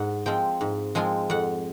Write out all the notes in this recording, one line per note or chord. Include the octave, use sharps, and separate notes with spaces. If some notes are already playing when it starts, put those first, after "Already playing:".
Already playing: G#2 F#5
F3 G#3 C4 F4 G5
G#2
F3 G#3 C4 F4 G#5
F2 F#5